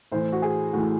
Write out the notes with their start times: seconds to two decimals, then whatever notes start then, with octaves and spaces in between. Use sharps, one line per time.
0.12 A2 E3 C5
0.32 F#4
0.42 G#4
0.73 A2 E3 F#4